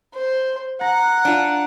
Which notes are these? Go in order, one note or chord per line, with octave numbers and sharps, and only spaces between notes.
C5
F#5 A#5
D4 F4